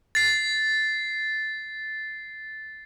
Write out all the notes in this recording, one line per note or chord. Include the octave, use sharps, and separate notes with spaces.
A6 C7